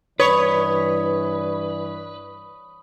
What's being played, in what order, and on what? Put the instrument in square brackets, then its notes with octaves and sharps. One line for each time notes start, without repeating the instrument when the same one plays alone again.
[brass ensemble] G2 E3 D5 [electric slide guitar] B4 [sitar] C#5 [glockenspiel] B5 C#6 D#6